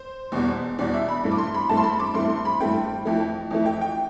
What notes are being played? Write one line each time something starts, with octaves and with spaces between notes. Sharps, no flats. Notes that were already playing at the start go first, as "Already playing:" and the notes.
Already playing: C5
E2 B2 G3 B3
E2 B2 G3 B3 D5
E5
B5
G2 E3 A3 C4
D6
C6
B5
G2 E3 A3 C4 A5
C6
B5
D6
G2 E3 A3 C4 C6
C6
B5
G2 E3 A3 C4 G5
F2 E3 A3
F2 E3 A3
G5
G5